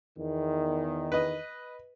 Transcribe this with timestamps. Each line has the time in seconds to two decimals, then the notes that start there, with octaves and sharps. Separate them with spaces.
0.18 E2 D#3
1.12 B4 D#5